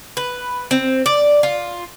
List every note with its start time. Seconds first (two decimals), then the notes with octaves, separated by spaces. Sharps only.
0.17 B4
0.71 C4
1.06 D5
1.43 F4